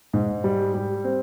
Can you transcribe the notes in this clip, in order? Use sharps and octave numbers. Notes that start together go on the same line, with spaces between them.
G#2
G3
G3
C4